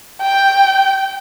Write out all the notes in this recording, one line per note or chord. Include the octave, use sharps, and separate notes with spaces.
G5